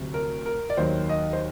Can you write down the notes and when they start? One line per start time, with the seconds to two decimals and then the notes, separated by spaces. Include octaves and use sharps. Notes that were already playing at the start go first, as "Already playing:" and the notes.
Already playing: D2 C3 F#3
0.14 A#4
0.46 A#4
0.70 D5
0.77 D#2 D#3 F#3 C5
1.09 D#5
1.33 C5